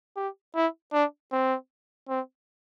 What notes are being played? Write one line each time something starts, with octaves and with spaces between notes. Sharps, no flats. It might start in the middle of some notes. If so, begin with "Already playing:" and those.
G4
E4
D4
C4
C4